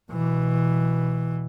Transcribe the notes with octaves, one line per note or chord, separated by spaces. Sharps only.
B2 E3